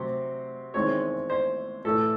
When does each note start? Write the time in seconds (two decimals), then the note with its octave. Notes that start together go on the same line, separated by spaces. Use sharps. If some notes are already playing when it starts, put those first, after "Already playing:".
Already playing: C3 F#3 C4
0.74 E2 D#3 G#3 C4 C#5
1.30 C5
1.85 A2 E3 A3 A4